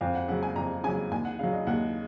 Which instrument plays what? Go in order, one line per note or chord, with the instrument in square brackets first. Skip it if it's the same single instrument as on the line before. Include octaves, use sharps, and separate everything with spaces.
[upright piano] F2 F5
F#5
C#3 F#3 F#5
G#5
F2 A#5
C#3 F#3 G#5
D#2 G#5
F#5
C#3 F#3 F5
D#5
D#2 F#5